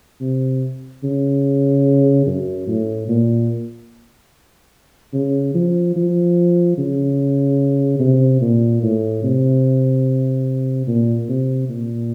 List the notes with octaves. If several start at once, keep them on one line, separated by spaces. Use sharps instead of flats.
C3
C#3
F#2
A2
A#2
C#3
F3
F3
C#3
C3
A#2
A2
C3
A#2
C3
A#2